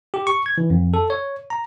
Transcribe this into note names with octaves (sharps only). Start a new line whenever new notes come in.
G4
C#6
G#6
E3
F2
A4
C#5
A#5